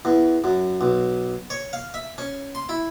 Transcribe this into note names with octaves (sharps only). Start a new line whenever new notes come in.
E2
F#2
B1
C#5
F5
E5
C#4
C6
E4